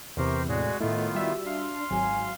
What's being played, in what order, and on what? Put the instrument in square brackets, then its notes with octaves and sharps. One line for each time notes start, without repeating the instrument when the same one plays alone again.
[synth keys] E2 C3 [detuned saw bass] E3 [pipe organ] G4 A#4 C5 [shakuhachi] C#6
[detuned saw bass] A2 [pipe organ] G#3 F#4 G#4 [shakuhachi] D5
[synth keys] A2 A3 [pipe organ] D#3 B3 F4 [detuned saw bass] E4 [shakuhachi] D#5
[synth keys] G3 E5 [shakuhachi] F#4
[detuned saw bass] D4 [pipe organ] F5 C6
[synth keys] G#1 [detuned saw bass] F#3 [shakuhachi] G#5